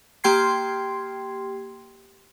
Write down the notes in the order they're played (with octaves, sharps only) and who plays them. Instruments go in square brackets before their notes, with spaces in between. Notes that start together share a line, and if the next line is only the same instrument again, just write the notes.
[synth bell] A#3 G4 G5 C6 G#6 C7